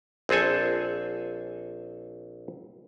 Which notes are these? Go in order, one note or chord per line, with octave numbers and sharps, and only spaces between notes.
A#1 C4 G#4 A4 G#5